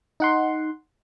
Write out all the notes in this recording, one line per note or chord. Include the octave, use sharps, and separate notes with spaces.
D#4 F#5 C6